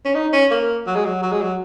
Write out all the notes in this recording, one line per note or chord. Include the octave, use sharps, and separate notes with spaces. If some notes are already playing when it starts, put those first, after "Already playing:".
C#4
D#4
C#4
A#3
F#3
G#3
F#3
F#3
G#3
F#3